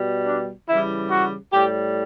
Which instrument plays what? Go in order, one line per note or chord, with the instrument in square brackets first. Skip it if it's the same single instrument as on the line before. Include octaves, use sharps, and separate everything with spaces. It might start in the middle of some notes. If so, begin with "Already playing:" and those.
Already playing: [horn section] B2 G3
D4
C#3 E3 G3 E4
F#4
A2 G3 G4